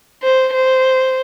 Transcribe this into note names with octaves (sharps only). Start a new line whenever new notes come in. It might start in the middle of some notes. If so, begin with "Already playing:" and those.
C5
C5